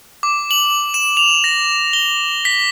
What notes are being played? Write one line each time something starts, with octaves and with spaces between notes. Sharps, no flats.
D6
F#7
E7
F7
A#6
G7
B6